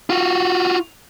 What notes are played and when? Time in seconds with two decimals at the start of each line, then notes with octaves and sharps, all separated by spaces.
0.10 F4 F#4